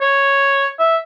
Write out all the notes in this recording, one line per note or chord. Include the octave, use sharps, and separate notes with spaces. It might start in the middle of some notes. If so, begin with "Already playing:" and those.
C#5
E5